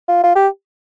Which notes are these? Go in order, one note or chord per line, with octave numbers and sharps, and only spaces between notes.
F4
F4
G4